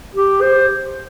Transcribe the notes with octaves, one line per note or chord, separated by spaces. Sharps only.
G4
C5